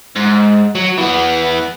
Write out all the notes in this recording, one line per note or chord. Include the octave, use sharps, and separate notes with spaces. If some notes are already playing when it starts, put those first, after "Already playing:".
G#2
F#3
E3 B3